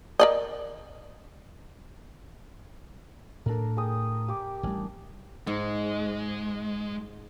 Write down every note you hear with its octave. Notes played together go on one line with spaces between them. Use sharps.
A#4 D5 D#5
A2 D4 A4 A#4
G#4 G5 D#6
G4 D5 D6
A1 G3 D4 G#5
G#2 G#3